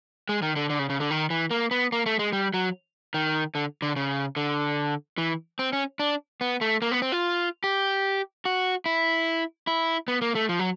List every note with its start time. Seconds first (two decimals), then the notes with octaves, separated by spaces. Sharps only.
0.29 G#3
0.42 D#3
0.56 D3
0.70 D3
0.79 C#3
0.90 C#3
1.00 D3
1.11 D#3
1.30 E3
1.51 A#3
1.71 B3
1.92 A#3
2.06 A3
2.19 G#3
2.33 G3
2.54 F#3
3.14 D#3
3.55 D3
3.82 D3
3.96 C#3
4.36 D3
5.18 E3
5.59 C4
5.73 C#4
5.99 D4
6.41 B3
6.61 A3
6.82 A#3
6.91 B3
7.02 C4
7.12 F4
7.64 G4
8.45 F#4
8.86 E4
9.67 E4
10.08 B3
10.22 A#3
10.35 A3
10.49 F3
10.59 F#3